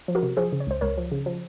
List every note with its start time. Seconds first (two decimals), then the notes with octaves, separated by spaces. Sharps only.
0.08 F3
0.15 F#4 A#4
0.23 C3
0.37 F3 G#4 C5
0.53 C#3
0.60 C#5
0.67 C#2 C5
0.81 C#2 A#4 C#5
0.98 F3
1.12 C#3
1.26 F3